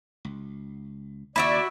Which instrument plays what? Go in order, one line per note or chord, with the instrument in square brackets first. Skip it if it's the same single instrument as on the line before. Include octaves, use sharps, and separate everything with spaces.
[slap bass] C#2
[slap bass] D#2 C#3 [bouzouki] E4 F#4 E5 [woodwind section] D5 [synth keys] B5